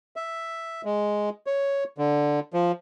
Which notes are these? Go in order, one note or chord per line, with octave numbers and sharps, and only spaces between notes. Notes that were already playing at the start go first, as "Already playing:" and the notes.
E5
G#3
C#5
D3
F3